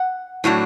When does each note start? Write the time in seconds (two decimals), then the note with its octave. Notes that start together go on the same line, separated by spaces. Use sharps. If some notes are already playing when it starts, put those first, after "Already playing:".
Already playing: F#5
0.44 A2 F#3 A3 D4